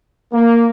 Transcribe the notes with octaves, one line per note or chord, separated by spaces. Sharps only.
A#3